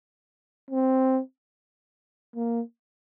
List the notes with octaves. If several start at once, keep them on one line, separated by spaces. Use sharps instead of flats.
C4
A#3